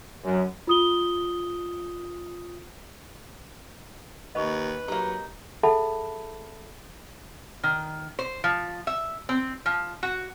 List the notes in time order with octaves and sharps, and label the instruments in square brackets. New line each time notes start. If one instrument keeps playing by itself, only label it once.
[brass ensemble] F#2
[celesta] F4 D#6 G7
[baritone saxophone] D#2 [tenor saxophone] B4 [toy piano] D#5 B5 C#6
[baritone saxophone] F#3 [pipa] A#3 D#4 [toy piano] G4
[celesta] G#4 A4 E5 F#5 A5 B5
[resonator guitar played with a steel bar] D#3
C5
F3
E5
C4
F3
F#4